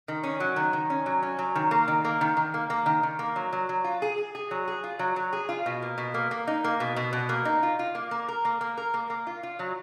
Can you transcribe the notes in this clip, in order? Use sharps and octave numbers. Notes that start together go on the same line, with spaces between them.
D#3
C#4
F#3
D#3
D#3
C#4
F#3
C#4
F#3
D#3
A#3
D#3
A#3
D#3
D#3
A#3
A#3
D#3
D#3
A#3
F#3
F#3
F#3
F4
G#4
G#4
G#4
F#3
G#4
F4
F#3
F#3
G#4
F4
B2
A#3
B2
A#3
A#3
D#4
A#3
B2
B2
B2
A#3
D#4
F4
F4
A#3
A#3
A#4
A#3
A#3
A#4
A#3
A#3
F4
F4
F#3